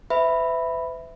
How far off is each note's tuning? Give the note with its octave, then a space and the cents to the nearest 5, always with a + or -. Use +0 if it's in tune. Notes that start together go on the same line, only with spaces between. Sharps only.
B4 +45 E5 +0 B5 +0